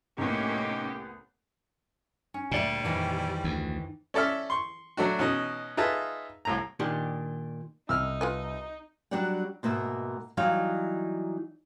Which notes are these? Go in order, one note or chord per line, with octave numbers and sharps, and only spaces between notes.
C2 A2 A#3 B3 C#4 D#4 G4
C#4
D2 A#2 G3 D5 E5
F2 D#3 E3
D2
C#4 A4 D5 E5 F6
C6 C#6
F#3 A3 D4 F#4
B2 C#4 D#4
D#4 F4 G#4 B4 E5 A5
C2 A2 A#5
A#2 D#3 D4 G4
C2 D#4 E6 F6
F4 B4 D#5
F#3 G3 D4 G4 D5 F#5
G#2 B2 A#3 E5
E3 F#3 G3 D#4 F5